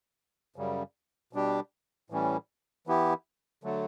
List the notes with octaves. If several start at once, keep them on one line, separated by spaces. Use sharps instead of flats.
F#2 C#3 G3
B2 G3 D4 G4
A2 E3 G3 C#4
E3 B3 E4 G4
D3 F#3 A3